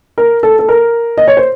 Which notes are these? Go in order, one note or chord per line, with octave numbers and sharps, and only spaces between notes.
A#4
A4
A4
A#4
D#5
C#5
C5